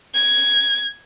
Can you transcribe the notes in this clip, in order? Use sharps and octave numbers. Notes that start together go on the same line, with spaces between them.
G#6